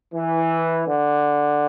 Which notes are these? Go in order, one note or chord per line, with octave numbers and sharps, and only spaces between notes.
E3
D3